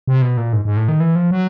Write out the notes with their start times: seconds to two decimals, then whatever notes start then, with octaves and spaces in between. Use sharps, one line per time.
0.07 C3
0.22 B2
0.37 A#2
0.53 G#2
0.65 G#2
0.77 A2
0.88 D#3
1.00 E3
1.16 F3
1.31 F#3